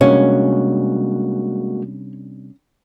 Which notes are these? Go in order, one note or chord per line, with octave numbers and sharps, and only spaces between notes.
C3 G3 G#3 A#3 C#4 D4 F#4 C#5